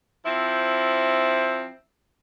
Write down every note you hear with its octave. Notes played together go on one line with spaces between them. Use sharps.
F3 C4 E4